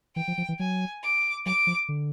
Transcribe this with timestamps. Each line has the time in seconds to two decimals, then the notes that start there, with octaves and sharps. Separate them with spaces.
0.16 E3 G5
0.28 F3
0.38 F3
0.49 E3
0.59 F#3 G#5
1.03 D6
1.46 F#3 D6
1.67 F3
1.89 D3